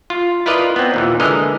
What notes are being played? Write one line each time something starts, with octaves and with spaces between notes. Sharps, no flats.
F4
E4 F4 A#4 B4 D5 D#5
B3 C4
D#2 A#2 E3
D3 E3 G#3 A#4 D#5